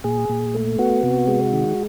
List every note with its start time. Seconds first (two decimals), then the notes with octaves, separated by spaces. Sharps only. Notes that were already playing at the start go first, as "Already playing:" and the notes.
0.04 A#2 G#4
0.29 A#2
0.54 A3
0.79 B3 F#4
1.03 C3
1.28 G#3
1.53 D#3